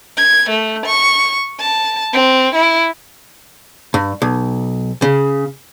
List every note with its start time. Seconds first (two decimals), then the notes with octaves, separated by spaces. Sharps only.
0.17 G#6
0.50 A3
0.86 C#6
1.60 A5
2.13 C4
2.55 E4
3.94 G2
4.22 B1
5.02 C#3